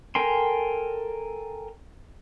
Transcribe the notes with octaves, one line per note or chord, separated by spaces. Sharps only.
A4 A#4 G5 G#5 C6